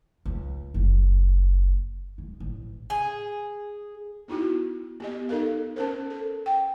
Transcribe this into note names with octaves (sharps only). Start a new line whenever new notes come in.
C#2
F#1
G#3
A1
G#4
B3 D#4 E4 F#4
B3 G4 D#5
D#4 A4 A#4 F5
C#4 A#4 C5
A4
G5